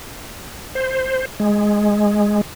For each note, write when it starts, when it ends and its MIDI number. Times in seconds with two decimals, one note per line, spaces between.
0.75 1.25 72
1.40 2.41 56